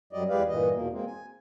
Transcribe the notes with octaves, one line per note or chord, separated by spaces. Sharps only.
F#2 F#3 G3 D5 D#5
E2 G#3 G4 B4 D5 F5
G2 A#2 E3 D#5
E2 B2 A#3
G#3 A#3 C4
G#5